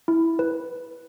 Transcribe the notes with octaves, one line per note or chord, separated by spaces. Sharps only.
E4
B4